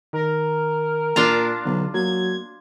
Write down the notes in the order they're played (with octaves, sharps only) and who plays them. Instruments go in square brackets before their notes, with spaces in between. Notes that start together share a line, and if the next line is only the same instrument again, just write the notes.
[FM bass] D#3 [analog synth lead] A#4
[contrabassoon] A#2 [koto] D4 F4 A#5
[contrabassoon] B1 [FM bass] D3
[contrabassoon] F#3 [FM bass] A#3 [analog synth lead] G#6